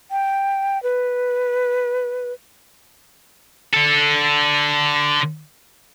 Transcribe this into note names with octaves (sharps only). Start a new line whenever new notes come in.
G5
B4
D3 A4